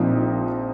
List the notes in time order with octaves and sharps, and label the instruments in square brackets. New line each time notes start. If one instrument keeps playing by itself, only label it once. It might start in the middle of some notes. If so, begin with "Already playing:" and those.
Already playing: [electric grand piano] A#1 A#2 F3 C4 D#4